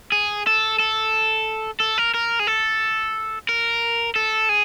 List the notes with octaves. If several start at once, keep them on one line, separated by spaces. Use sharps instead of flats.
G#4
A4
A4
A4
A#4
A#4
G#4
A4
A#4
A4
G#4